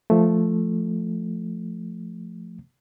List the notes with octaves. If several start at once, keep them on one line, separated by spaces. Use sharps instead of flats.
F3 A3